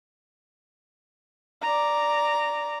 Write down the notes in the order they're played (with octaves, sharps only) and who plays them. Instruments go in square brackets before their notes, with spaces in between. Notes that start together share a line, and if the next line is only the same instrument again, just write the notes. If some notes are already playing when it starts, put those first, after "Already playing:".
[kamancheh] D5 A#5